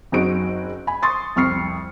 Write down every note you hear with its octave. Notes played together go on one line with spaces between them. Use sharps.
F#1 C4 D#4 F#4 G#4 D7
G#5 B5
C6 C#6 D#6 A6
C2 F2 C#6 F6 C7 C#7